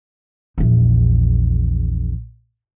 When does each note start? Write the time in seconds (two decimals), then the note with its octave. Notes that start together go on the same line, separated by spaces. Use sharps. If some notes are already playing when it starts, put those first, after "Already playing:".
0.58 A#1 E2